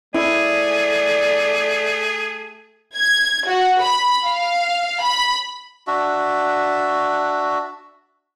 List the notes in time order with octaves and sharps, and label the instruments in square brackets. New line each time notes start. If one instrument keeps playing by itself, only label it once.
[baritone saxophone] A3 [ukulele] E4 [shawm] G#4 [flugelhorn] D5
[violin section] G#6
F#4
B5
F5
B5
[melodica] D4 F#4 E5